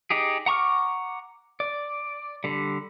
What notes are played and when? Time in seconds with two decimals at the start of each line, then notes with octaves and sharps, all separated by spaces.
0.10 D#4 G4 G#4
0.46 F#5 A#5 C#6 D6 F6
1.60 D5
2.44 D3 G3